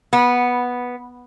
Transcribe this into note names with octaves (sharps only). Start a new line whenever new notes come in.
B3